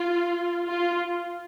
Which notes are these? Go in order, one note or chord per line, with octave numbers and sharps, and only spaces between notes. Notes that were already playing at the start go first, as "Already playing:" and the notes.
Already playing: F4
F4